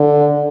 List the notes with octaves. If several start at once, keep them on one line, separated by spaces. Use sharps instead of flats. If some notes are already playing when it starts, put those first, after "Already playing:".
Already playing: D3